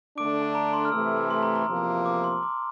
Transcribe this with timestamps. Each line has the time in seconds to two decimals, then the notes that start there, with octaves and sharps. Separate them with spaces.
0.18 D3 A3 D4 D6 D7
0.42 A5
0.55 A#5
0.73 C6
0.85 F6
0.92 C3 E3 A3 E6
1.11 E6
1.30 C6
1.43 A#5
1.55 A#5
1.67 E2 C3 F3 A#3
2.06 D6
2.24 C6
2.43 D6